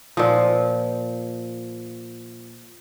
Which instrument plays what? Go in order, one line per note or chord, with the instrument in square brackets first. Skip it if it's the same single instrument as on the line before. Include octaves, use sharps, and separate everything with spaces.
[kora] A#2 F3